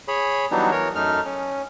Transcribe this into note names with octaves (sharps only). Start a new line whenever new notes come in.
G#4 C#5 B5
E3 F#3 G3 B3 D4 D#4
E3 A#4 C#5
F#2 A3 D#4 F6
C#4